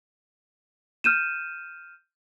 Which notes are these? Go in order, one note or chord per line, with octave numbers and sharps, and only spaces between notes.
F6 G6 D#7 E7